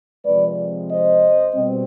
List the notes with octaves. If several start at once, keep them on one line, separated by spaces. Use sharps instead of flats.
C3 F3 G#3 C4 B4 D5
C5 D#5
B2 G3 C4